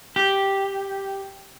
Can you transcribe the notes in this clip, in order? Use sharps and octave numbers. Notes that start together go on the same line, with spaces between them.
G4